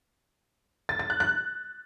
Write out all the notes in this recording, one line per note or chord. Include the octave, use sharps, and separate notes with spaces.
A6
A6
F#6
F#6